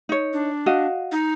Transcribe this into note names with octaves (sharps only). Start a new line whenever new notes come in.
D#4 C#5
D4
F#4 D#5 F5
D#4